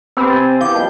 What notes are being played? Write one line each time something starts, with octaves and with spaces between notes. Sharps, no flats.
B3 C4 G4 B5 E6
C3 G#5 A6
E3 B3 G4 F5 D6 G6
F3 G3 A#3 D#5 G5 A5